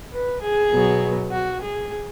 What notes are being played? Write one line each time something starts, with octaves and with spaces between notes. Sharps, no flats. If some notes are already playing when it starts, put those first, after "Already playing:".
B4
G#4
B2 F#3 B3
F#4
G#4